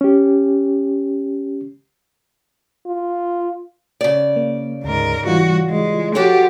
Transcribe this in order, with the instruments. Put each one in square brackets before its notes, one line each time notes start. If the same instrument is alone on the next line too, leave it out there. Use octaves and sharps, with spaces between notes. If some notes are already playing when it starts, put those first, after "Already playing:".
[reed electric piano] C#4 G4
[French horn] F4
[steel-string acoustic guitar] C#3 D5
[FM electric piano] A#3
[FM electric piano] D2 [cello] G#2 A#4
[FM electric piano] E3 G3 F4 [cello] F#4
[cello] G#3
[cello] F3 G4 [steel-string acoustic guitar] F#4 A4 C#5